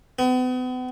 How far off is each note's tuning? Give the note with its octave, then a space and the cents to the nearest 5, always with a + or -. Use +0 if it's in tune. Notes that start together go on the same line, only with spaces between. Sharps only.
B3 +40